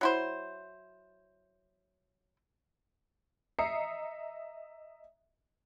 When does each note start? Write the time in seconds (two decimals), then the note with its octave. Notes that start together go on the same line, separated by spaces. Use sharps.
0.01 F#3 E4 C5
3.59 D#5 E5 A#5 D#6 C7 C#7